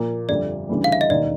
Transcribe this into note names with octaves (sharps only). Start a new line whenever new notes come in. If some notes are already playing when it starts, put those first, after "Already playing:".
Already playing: A#2 F3 A#3
G1 F2 D3 G3 D5
D2 C#3 E3 G3
F5
E5
D#5
E1 D#2 D#3 D5